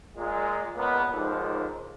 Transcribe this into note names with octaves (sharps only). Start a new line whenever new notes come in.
A#2 G#3
C#2 A#2 A#3 B3
D#2 G#2 D3 D#3 F3